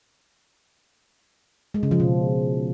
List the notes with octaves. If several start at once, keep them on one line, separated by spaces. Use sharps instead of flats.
G#3
C#3
F3
B2